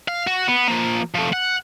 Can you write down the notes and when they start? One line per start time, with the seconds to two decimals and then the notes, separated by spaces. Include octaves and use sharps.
0.08 F5
0.27 F#4
0.48 B3
0.68 F3 A#3
1.15 F3 A3
1.33 F#5